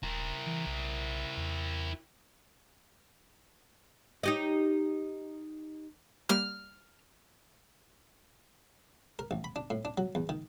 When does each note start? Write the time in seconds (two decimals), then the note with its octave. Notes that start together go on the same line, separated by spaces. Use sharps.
0.03 D#1 E4 A#4
0.46 E3
0.67 B1
1.37 E2
4.23 D#4 G4 D#5
6.29 G3 A#3 F6
9.19 A#4
9.31 A1
9.44 B5
9.56 D4
9.70 A2
9.85 D4
9.98 F#3
10.15 E2
10.29 D#3